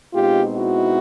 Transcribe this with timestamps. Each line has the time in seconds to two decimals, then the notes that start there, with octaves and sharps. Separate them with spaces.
0.13 B2 G#3 C4 D#4 F4 G4
0.55 E4 F#4